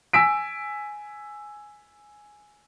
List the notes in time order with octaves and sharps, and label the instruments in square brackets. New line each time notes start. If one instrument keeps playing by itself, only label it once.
[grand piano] G#5 E6 B6 D7